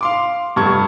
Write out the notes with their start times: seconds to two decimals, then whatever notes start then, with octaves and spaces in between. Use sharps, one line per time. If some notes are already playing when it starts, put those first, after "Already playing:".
0.01 F5 C6 D6
0.56 F1 G2 C#6 G#6